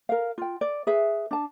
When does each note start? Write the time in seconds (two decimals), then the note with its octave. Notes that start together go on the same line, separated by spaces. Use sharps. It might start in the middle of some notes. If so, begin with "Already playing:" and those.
0.09 A#4 F5
0.38 F4 G5
0.61 D5
0.87 G#4 B4 E5
1.31 D4 A5